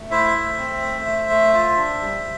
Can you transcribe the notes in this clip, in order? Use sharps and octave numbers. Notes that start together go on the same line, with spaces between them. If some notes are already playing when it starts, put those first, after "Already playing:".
Already playing: A3
E4 C5 E5
A3
C4
A3
A3
A3
F4
D4
G3